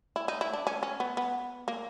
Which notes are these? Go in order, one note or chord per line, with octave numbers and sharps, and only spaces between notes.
E4
D#4
E4
D4
C#4
C#4
B3
B3
A#3